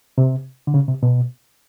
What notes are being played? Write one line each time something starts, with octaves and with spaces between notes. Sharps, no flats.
C3
D3
C#3
C3
B2